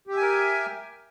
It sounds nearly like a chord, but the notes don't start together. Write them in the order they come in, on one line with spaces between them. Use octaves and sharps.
G4 E5 G#5 A#4